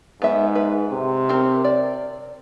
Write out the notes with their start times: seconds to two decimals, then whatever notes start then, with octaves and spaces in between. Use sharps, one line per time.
0.22 G#2 B3 E5
0.55 B4
0.92 C3
1.29 C4 A#4
1.64 D5